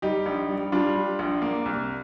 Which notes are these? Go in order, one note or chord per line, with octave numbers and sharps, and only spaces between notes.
G3 D#4 G4
A#1
G3
G3 D4 F4
G3
A#1
A#3
C2